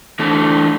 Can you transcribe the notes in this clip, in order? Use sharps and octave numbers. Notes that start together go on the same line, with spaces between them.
E3 A3 D4 A4